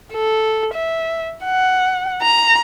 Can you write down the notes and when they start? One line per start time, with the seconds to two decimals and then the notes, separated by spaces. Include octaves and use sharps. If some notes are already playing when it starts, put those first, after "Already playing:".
0.13 A4
0.74 E5
1.44 F#5
2.22 A#5